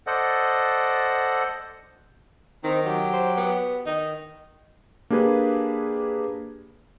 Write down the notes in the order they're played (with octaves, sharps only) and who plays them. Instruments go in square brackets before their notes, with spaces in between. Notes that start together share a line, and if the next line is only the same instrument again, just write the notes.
[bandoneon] A4 C5 D5 D#5 F#5
[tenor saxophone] D#3 [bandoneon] C4 D#4
[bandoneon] F#3 G4
[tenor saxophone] C5
B3
[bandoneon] D#3 [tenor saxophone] D#4
[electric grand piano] A#3 D4 G4 G#4 B4